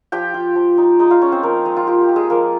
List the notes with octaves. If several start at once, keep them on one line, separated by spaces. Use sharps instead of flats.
F3 G4 G5
F4
F3
D#4
G#3 D#4 D#5
F4 F5
C#4 F4 C#5
C4 C5
F3 A#3 A#4
G#3 D#4 G#4
F4
F4 G4
G4
A#3
G#3 G#4
F3 A#3 A#4